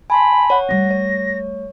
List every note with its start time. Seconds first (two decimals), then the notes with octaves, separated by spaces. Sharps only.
0.10 G#5 A5 B5 C6
0.50 C#5 F#5
0.69 G3 A3 A#6
0.91 C#5